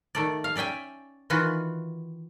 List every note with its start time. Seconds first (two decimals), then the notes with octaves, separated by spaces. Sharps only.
0.15 D#3 A3 D5
0.44 F5
0.56 C#4 D5 E5 G5 G#5
1.30 D#3 E3 F4 F#4 B4